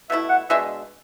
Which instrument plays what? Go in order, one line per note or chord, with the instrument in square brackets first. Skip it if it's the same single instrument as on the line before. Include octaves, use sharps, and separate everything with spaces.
[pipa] B2 A3 E4 [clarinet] E5
[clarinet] F#5
[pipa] B2 G#3 D4 [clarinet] E5